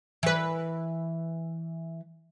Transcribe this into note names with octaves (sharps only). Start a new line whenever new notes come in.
E3 B4